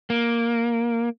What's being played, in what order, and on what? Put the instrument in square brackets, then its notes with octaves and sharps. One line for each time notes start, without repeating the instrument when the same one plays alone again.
[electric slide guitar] A#3